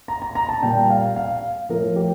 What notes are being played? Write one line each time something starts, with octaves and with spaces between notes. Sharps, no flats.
A#5
A#5
A#5
A5
A#2 G3 G5
F5
F5
A2 F3 A#4
G4